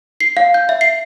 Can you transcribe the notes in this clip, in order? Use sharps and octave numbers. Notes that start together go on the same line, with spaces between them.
C7
F5
G6
E5
C7